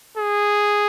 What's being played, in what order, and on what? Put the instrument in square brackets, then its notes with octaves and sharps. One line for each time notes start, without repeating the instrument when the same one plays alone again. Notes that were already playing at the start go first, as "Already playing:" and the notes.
[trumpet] G#4